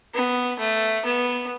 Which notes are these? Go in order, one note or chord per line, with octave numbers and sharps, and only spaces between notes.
B3
A3
B3